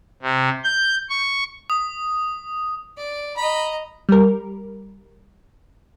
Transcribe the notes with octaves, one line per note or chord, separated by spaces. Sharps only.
C3
G6
C#6
D#6
D5
D#5 A#5 B5
G3 A#4